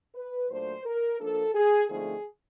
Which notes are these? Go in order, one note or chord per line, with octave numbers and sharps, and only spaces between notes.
B4
A#2 F#3 A3 D4 C5
A#4
F3 A#3 D4 A4
G#4
D3 F3 A3 C4 D#4 G#4